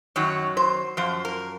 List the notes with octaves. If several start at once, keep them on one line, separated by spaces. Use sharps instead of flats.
F#2 D#3 F#3 C#5
C5
F#2 F3 C5
A#4